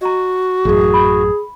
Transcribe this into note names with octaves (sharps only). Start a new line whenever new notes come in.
F#4 D#5 A#5
A1 F#2 G#4
B5